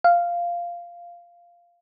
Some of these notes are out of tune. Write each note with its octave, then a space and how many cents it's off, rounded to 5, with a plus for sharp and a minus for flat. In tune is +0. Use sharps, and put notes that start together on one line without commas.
F5 -5